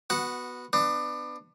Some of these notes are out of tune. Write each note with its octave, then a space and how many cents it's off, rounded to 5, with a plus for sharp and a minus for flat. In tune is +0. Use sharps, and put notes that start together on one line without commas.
B3 +0 F#4 +5 F#5 -15
B3 +20 D4 +25